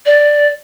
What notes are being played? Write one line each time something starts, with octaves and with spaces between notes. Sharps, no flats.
D5